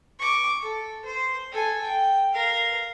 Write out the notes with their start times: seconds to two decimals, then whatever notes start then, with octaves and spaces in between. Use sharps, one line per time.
0.19 C#6 D6
0.61 A4
1.05 C5
1.52 A4 G#5
1.82 G5
2.34 A#4 F5